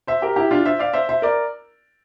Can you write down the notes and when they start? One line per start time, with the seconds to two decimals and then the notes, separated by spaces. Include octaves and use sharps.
0.07 C5 E5
0.22 G4 A#4
0.36 E4 G4
0.51 D4 F4
0.65 C5 E5
0.79 D5 F5
0.93 C5 E5
1.09 C5 E5
1.22 A#4 D5